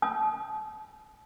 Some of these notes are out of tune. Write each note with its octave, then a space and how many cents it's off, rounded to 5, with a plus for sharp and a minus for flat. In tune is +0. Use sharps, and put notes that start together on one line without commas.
A5 -35 D#6 +0